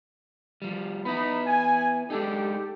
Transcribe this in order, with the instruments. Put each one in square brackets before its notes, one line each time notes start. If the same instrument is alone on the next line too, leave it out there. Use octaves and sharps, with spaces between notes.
[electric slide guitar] F3 G3
[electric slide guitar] B3 E4 [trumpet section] D#4 B5
[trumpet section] G#5
[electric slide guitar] G#3 D4 D#4 [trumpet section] G4 A4